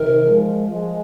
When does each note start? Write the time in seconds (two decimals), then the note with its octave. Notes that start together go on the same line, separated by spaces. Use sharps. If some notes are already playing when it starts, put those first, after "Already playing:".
Already playing: C3 D#3 A#4
0.23 F3 G#3
0.66 F3 G#3